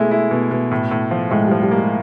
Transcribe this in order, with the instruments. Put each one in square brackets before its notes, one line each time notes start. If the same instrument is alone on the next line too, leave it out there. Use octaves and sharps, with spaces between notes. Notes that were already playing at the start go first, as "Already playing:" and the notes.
Already playing: [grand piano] B2 G#3 E4 [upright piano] A3
[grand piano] E4
B2
B2
A2
A2
F3
[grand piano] A2 [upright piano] G#3
[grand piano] F3 [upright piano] G3
[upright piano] G3
[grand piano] A#3
[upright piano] G#3